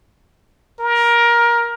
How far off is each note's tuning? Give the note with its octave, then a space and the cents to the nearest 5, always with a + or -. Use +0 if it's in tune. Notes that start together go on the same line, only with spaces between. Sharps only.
A#4 +20